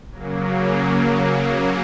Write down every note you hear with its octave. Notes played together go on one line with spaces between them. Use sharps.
C#3 F#3 A#3